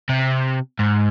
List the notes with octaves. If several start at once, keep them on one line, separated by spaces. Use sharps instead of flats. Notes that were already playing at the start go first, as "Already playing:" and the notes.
C3
G#2